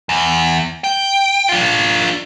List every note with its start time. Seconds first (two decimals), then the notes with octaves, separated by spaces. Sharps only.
0.09 E2
0.84 G5
1.49 D4 F4